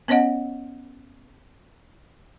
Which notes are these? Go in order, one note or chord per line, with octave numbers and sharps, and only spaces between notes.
B3 C#4 C#5 D#5 F#5